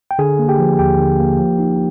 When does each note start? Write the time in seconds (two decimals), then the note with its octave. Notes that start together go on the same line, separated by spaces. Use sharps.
0.11 G5
0.19 D3 G#4 G#5
0.39 A#3
0.49 G4 G5
0.59 F3
0.79 D#2 G4 G5
0.99 D3
1.19 A#3
1.39 F3
1.59 D#4